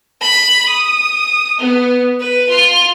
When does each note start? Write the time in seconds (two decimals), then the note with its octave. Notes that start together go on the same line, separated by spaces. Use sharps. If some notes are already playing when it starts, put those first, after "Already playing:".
0.21 B5
0.69 D#6
1.58 B3
2.20 B4
2.49 F4